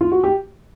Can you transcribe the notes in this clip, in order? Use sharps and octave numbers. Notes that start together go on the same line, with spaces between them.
F4
F#4
G4